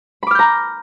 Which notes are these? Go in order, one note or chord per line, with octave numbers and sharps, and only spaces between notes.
A#5 B5 D6 F6 G6